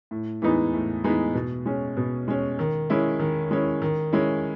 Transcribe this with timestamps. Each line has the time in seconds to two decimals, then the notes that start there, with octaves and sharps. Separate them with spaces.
0.11 A2
0.42 E3 G#3 B3 D#4
0.73 A2
1.04 E3 G#3 B3 D#4
1.34 B2
1.66 G#3 C#4
1.97 B2
2.28 G#3 C#4
2.59 D#3
2.90 G#3 C#4 E4
3.19 D#3
3.51 G#3 C#4 E4
3.82 D#3
4.13 G#3 C#4 E4